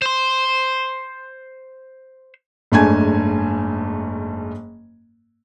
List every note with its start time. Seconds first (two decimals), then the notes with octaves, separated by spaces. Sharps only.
0.02 C5 C6
2.72 F#1 G#2 A3 D4 G#5 G#6